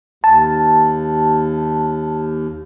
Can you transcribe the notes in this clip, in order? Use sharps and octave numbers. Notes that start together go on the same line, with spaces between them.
D#2 A5